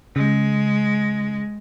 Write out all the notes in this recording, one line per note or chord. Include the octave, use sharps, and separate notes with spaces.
C#3 G#3